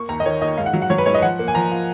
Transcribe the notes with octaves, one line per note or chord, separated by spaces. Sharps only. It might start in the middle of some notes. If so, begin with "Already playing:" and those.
Already playing: A#3 C#6
D#2 A#5
D#5
D#3 C#5
D#3 D#5
G#2 F5
F#5
F#3
F#5
F#3 C#5
B4
G#2 C#5
D#5
F3 F#5
A#3
G#5
F3 A#5
F4